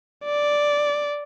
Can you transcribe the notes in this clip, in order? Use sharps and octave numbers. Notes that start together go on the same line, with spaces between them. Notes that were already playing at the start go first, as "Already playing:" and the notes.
D5